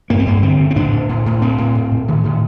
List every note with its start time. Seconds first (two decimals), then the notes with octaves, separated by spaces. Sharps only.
0.10 G2 A#3
0.19 C4
0.26 G2 A#3
0.43 D3 C4
0.59 D3
0.70 C4
0.76 A2 D4
0.93 A2
1.09 A2
1.26 A2
1.42 A2 C4
1.58 A2
1.75 A2
1.91 A2
2.08 A2 D#3
2.24 A2 D#3